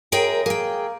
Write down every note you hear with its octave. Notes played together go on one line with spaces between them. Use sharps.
F#2 G#4 A#4 G5
A#3 G#4 G5